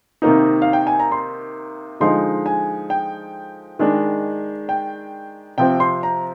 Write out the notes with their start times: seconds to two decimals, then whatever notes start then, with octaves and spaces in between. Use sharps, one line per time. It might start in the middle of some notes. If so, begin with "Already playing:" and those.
0.22 C3 D#3 A#3 D#4 A#5
0.62 F5
0.73 G5
0.87 G#5
1.00 A#5
1.12 C6
2.00 D3 F3 G#3 D#4 C6
2.46 G#5
2.90 G5
3.79 D#3 G#3 D4
4.69 G5
5.58 C3 F3 C4 G5
5.80 C6
6.03 A#5